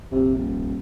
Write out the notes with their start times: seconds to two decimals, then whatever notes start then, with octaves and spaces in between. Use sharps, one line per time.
0.12 F1 A#1 C3
0.34 D#1